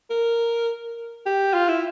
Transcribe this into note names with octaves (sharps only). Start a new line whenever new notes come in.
A#4
G4
F4
E4